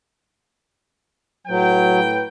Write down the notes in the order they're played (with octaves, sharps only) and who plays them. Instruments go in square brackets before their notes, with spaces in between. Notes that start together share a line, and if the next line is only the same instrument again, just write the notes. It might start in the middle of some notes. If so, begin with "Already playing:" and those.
[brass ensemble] A2 B4 G5 [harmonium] F#3